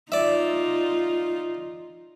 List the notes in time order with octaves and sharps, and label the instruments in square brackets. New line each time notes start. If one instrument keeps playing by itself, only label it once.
[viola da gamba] D#4 F4 [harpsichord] D5 E5